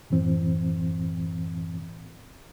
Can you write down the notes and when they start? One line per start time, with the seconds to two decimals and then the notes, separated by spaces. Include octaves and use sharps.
0.10 F#2 A2 E3 C4